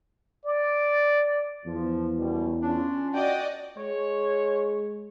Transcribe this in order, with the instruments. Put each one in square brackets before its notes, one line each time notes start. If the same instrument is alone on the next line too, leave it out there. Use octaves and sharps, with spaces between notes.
[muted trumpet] D5
[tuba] E2 [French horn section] F3
[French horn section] F#2 B2 G3
[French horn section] C#4 F4 [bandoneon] D4
[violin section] F#4 D5 D#5 [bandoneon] G5
[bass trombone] G#3 [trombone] C#5